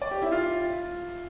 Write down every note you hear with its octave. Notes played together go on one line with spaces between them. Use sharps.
D5
G4
E4
F4